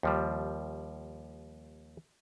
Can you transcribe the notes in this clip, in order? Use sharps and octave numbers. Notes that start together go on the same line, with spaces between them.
D#2 F3 G3